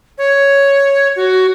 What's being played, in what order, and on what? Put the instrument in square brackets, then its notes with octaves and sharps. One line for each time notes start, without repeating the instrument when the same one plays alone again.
[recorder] C#5
F#4